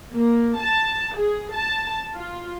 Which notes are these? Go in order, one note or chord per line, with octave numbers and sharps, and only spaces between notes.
A#3
A5
G#4
A5
F4